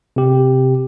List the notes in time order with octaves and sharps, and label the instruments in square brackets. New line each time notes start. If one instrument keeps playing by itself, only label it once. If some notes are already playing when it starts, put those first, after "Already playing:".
[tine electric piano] C3 G4